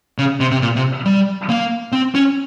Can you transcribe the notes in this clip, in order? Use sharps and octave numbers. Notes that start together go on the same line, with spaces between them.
C#3
C3
C3
A#2
C3
G3
A#3
C4
C#4